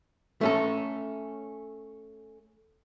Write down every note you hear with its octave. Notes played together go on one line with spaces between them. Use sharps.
A3 C#4 A4